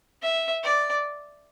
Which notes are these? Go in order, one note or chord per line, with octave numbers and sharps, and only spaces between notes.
E5
D5